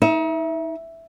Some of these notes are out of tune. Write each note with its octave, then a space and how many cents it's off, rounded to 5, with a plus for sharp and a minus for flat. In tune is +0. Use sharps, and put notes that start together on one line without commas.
D#4 +35 E5 +0